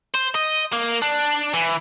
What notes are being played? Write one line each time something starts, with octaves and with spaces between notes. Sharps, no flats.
C5
D#5
A#3
D4
E3